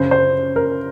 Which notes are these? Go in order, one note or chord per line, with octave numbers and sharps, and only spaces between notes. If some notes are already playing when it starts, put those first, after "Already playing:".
Already playing: F#2 C#3 C5
C5
A#4